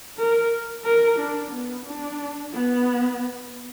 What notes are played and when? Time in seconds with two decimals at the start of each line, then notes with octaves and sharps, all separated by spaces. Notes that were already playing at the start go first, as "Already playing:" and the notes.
0.18 A#4
0.85 A#4
1.19 D4
1.51 B3
1.85 D4
2.53 B3